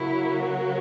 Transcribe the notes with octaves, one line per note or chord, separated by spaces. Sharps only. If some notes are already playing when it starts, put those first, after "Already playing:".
Already playing: C#3 F#3 A#3 E4
F#4